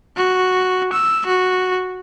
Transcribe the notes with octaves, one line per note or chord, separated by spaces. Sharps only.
F#4
E6
F#4